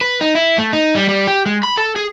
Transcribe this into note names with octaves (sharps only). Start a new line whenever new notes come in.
B4
D#4
E4
A3
D#4
G3
G3
G4
G#3
B5
A4
G#4